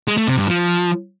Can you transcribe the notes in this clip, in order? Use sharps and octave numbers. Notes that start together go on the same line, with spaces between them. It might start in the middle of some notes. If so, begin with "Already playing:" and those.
G#3
A3
C3
G2
F3